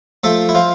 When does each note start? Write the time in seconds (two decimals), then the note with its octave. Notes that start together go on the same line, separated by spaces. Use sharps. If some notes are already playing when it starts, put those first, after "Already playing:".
0.24 F3 A3 A4
0.49 E4
0.55 F3 F4